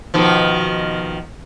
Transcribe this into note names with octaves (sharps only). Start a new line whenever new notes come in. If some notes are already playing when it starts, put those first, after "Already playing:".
B2 D#3 F3